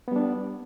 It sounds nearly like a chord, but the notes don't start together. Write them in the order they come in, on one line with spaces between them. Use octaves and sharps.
B3 G3 D4